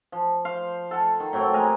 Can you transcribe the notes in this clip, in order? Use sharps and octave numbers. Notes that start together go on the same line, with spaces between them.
F3
C5 F5
A4 F#5 A5
D#3
A2 F#3 C4 G5
G#3 A#3 A#4 G#5